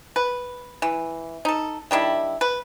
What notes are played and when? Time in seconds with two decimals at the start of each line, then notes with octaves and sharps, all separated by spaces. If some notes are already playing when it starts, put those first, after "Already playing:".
0.16 B4
0.82 E3
1.45 D#4 A4
1.91 D#3 G3 D4 E4
2.41 B4